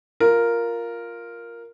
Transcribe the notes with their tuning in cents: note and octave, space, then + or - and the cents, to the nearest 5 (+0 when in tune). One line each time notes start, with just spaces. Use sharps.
F4 +0 A#4 +0